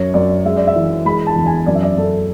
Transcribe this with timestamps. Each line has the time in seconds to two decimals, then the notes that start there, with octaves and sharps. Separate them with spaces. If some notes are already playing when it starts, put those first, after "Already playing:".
Already playing: F#2 C#5
0.14 F#2 D5
0.45 G#3 E5
0.57 D5
0.67 E5
0.75 E3
1.05 G#3 B5
1.27 A5
1.36 E2
1.46 G#5
1.66 F#2 D5
1.75 E5
1.83 D5
1.97 F#2 A4